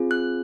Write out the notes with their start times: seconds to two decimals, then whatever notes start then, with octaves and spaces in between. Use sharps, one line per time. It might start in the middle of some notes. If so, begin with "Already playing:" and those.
Already playing: C4 F4 G#4
0.11 F#6